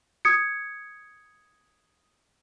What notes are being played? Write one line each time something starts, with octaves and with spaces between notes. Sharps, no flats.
D#6 G#6 C#7